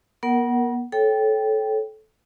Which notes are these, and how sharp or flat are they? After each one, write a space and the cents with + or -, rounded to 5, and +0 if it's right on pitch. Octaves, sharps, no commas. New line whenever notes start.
B3 -40 A#4 +0 F#5 +15
A4 -20 C#5 -15 G5 +0